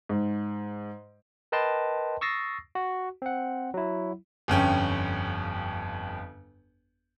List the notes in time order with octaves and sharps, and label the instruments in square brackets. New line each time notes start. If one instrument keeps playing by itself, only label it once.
[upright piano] G#2
[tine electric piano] A#4 B4 D#5 G5 A5 C6
C#6 D#6 E6 A6 A#6 C7
F#4
C4 F#5
F#3 E4
[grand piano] G1 F2 C#4 G5